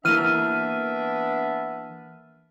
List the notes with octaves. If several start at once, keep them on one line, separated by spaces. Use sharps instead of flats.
E3 A#3 B3 D4 E5 F6 D#7